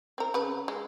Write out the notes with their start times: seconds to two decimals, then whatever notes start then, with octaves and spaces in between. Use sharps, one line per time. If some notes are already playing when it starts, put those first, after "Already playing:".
0.18 C4 A#4
0.34 C#3 B4
0.68 G#3